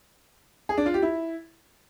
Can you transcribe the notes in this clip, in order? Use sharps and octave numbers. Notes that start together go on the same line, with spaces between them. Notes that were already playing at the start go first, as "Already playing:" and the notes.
G#4
D4
F4
G4
E4